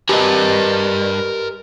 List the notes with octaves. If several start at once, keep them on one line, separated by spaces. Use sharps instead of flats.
G2 G4 A#4 B4 D#5 G#5